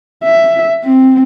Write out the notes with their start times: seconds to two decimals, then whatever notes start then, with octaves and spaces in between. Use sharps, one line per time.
0.24 E5
0.85 C4